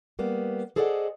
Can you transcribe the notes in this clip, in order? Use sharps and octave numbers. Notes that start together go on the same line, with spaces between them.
G3 A#3 B3
G#4 A4 C5 D5 D#5 F#5